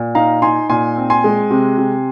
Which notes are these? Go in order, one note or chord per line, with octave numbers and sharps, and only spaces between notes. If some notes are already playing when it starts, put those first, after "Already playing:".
Already playing: A#2
D#4 F5 A#5
D#4 G#5 C6
A#2 G#5 C6
C4
G#5 C6
G#3
C3
C3